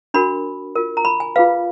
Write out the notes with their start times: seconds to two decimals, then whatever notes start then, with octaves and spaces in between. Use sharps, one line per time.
0.14 D4 F#4 A#4 B5
0.76 F4 A#4
0.97 A#5
1.05 B5
1.20 G#5
1.36 F4 G#4 B4 F5